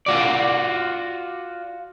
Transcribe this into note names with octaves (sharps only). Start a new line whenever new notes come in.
F4 F#4 D5